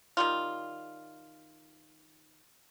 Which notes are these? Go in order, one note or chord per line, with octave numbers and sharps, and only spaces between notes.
D#3 G3 F4